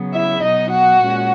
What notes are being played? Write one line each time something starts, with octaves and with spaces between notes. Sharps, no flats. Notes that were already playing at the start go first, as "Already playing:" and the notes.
Already playing: C#3 F#3 B3
E4 E5
B2 F#3 B3 D#4 D#5
F#4 F#5
A#2 G#3 C#4